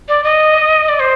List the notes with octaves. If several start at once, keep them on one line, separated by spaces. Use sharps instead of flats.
D5
D#5
D5
C5